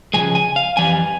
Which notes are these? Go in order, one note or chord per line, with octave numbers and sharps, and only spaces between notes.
C#2 C#3 F3 G#3 G#5
G#5
F5
F2 E3 G3 G#5